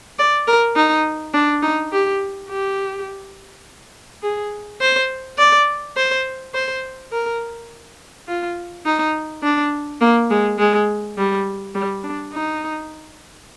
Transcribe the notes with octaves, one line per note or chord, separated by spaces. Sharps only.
D5
A#4
D#4
D4
D#4
G4
G4
G#4
C5
D5
C5
C5
A#4
F4
D#4
D4
A#3
G#3
G#3
G3
G3
D4
D#4